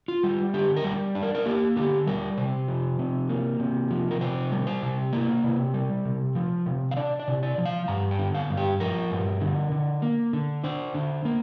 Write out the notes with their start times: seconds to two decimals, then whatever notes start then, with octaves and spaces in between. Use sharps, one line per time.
0.08 F4
0.23 G3
0.54 D3 G4
0.76 A#4
0.84 G3
1.15 D4
1.23 A#4
1.35 A#4
1.46 A#3 G4
1.76 D3 G4
2.07 G3 A#4
2.37 C3 C5
2.68 F3
2.99 C3
3.29 A#3
3.60 C3
3.91 F3
4.11 A#4
4.21 C3 C5
4.52 G3
4.67 C5
4.83 C3
5.13 A#3
5.44 C3
5.74 G3
6.05 C3
6.35 F3
6.66 C3
6.91 F5
6.97 D4 D5
7.20 D5
7.28 C3
7.43 D5
7.58 F3
7.66 F5
7.88 G2 A#5
8.11 G5
8.19 D3
8.34 F5
8.50 G2
8.57 G4
8.80 F3 A#4
9.11 G2
9.41 D3
9.72 D3
10.02 A#3
10.33 D3
10.64 D4 C5
10.94 D3
11.25 A#3